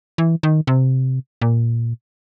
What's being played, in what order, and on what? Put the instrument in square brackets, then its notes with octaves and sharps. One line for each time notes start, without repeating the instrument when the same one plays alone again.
[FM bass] E3
D#3
C3
A#2